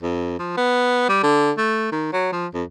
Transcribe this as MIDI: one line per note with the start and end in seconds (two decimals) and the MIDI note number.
0.02 0.37 41
0.39 0.54 53
0.57 1.07 59
1.09 1.19 55
1.23 1.51 50
1.58 1.89 57
1.92 2.12 51
2.13 2.32 54
2.32 2.47 53
2.54 2.64 41